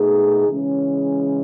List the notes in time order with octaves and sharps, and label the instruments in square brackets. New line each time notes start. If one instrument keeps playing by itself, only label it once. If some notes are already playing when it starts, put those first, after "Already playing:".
Already playing: [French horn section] B2 A3 D#4 G#4
C#3 E3 G#3 C#4